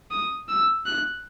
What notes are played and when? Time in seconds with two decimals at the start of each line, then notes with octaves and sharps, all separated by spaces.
0.11 D#6
0.49 E6
0.86 F#6